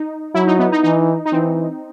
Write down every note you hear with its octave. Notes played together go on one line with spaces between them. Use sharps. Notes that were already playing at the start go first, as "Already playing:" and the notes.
Already playing: D#4
F#3 E4
D#4
B3
D#4
E3 D#4
D#4
E3 C4